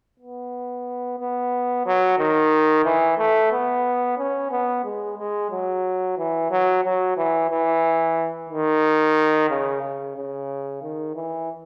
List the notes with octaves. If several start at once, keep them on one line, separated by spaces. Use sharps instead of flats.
B3
B3
F#3
D#3
E3
A3
B3
C#4
B3
G#3
G#3
F#3
E3
F#3
F#3
E3
E3
D#3
C#3
C#3
C#3
D#3
E3